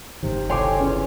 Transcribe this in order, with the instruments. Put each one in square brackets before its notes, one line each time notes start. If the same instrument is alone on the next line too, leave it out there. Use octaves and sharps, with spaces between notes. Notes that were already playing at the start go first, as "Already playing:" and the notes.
[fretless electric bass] F#1 G#2 D#3 [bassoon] C3
[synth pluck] C2 C#5 G#5 [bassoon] F2 [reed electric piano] G5 C6 D6
[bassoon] E2 [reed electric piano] C#4